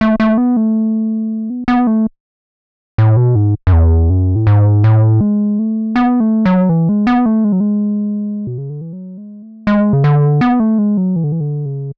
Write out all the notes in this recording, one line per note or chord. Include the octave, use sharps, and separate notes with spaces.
A3
A3
B3
A3
B3
B3
A3
A2
B2
G#2
F#2
E2
F#2
A2
G#2
A2
G#3
A3
B3
A3
F#3
E3
G#3
B3
A3
G#3
F#3
G#3
B2
C#3
D3
E3
F#3
G#3
A3
G#3
C#3
D3
B3
A3
G#3
F#3
E3
D3
E3
D3
C#3